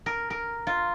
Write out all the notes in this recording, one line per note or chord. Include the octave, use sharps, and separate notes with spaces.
A#4
A#4
F4